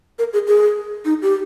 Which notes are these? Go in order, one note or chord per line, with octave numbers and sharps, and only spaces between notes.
A#4
G#4
G#4
D#4
G4